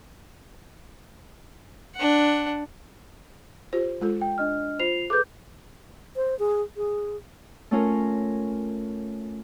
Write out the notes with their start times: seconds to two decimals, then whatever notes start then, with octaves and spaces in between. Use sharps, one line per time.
1.96 D4 F#5
3.73 F4 G4 C5
4.01 G#3 F4 A4
4.21 G5
4.38 D4 D#5 F6
4.79 F4 C5 C7 F7
5.10 G#4 A4 B4 D6 G6
6.16 C5
6.39 G#4
6.77 G#4
7.71 A3 C#4 F4 A#4